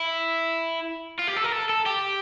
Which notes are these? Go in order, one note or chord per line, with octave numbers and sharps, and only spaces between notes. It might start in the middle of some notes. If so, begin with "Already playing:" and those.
Already playing: E4
F4
G4
A4
A#4
A4
A4
G4